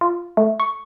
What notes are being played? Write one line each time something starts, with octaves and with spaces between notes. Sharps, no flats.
F4
A3
C#6